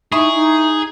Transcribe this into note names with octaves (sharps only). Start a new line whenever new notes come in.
D#4 E4 G#4 C#6 D#6
D#4